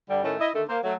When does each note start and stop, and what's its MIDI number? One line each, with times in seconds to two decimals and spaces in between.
0.09 0.20 43
0.09 0.20 50
0.09 0.20 55
0.23 0.34 45
0.23 0.34 51
0.23 0.34 57
0.23 0.34 61
0.39 0.49 64
0.39 0.49 75
0.53 0.62 50
0.53 0.62 51
0.53 0.62 57
0.68 0.77 58
0.68 0.77 72
0.83 0.93 54
0.83 0.93 57